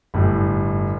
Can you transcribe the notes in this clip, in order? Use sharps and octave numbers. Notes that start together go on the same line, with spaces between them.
G1 A2 G3